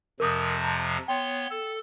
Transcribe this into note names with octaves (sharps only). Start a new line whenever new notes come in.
F2 C3 F3 A#4 D6 D#6
A5 A#5
B3 C#5 G5 C6
A4 E6